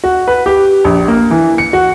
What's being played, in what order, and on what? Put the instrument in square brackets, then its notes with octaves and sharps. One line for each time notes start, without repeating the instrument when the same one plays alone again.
[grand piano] F#4
B4
G4
A#1
A#3
E3
C#7
F#4